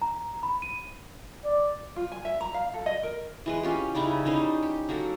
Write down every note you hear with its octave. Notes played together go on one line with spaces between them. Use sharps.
A#5
B5
D#7
D5
F4
G#5
E5
A#5
F5
A4
D#5
A#4
E3 G#3 B4
C#4 F4 G4
C#3 G3 D#4 E4
G3 C#4 D#4 C5
G4
F#3 A#3 F#4 A4